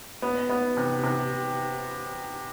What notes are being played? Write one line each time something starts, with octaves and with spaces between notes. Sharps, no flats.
B3
B3
C3
C3